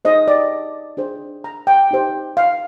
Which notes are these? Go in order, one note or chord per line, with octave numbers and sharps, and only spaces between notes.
D#4 G#4 C5 D#5
D5
D4 G#4 C5
A#5
G5
D#4 G4 C5
F5